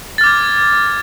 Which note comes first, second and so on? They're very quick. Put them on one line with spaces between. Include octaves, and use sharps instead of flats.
A6 F6 D6 G#6